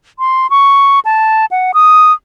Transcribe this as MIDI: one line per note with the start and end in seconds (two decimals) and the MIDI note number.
0.19 0.50 84
0.50 1.00 85
1.05 1.46 81
1.51 1.72 78
1.74 2.13 87